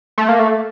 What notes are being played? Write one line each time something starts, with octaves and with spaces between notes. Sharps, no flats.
A3
A#3
A3